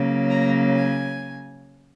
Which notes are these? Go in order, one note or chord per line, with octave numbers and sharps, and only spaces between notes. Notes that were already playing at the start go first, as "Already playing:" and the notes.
Already playing: C#3 F#3 A#3
A#5
G#5